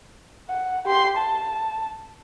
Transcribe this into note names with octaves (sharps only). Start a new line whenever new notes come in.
F#5
G4 C6
A5